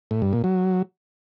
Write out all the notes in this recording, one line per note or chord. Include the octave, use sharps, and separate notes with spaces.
A2
G2
A#2
F#3